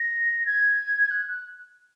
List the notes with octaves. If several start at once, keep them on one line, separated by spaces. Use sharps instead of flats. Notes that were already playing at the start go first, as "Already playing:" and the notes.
Already playing: A#6
G#6
F#6
F#6